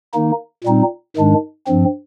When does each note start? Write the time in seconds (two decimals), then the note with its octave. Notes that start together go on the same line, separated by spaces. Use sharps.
0.14 D#3 A#3 D#4
0.64 A#2 G3 C4 D#4
1.16 G#2 D#3 G#3 D4
1.67 G2 F3 C4